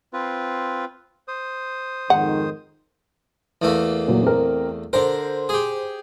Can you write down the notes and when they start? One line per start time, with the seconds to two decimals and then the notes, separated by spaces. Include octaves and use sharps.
0.13 C4 F4 B4
1.28 C5 D#6
2.10 F2 G#2 D#3 F#5
3.62 E2 A3 A#3
4.08 A#2 F#3
4.23 C4 A#4
4.93 D3 A#4 C5
5.49 G4 G#4